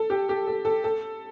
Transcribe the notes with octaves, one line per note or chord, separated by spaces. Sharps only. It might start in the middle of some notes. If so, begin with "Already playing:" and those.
Already playing: A4
G4
G4
A4
A4
A4